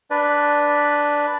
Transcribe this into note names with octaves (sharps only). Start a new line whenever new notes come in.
D4 B4 D5